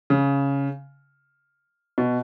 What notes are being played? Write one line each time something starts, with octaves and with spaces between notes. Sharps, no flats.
C#3
B2